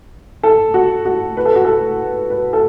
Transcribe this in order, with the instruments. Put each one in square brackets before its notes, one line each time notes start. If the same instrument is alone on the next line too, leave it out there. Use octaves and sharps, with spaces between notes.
[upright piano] A4
F#4
F#4
B4
A4
F#4
A4
B4
A4